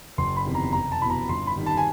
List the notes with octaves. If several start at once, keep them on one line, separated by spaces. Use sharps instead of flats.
F#1 C6
B5
E2 C3 D#3
A#5
F1 A#5
A5
E2 B2 B5
A#5
G1 C6
B5
G2 D#3
A5
G#5